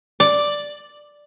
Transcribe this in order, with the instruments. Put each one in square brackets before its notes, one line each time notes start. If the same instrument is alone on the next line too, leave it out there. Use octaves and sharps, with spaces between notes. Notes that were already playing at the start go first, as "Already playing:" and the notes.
[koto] D5